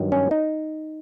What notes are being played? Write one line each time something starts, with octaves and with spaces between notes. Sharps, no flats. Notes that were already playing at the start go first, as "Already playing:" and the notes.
Already playing: G2 D#3 F#3
C#4
D#4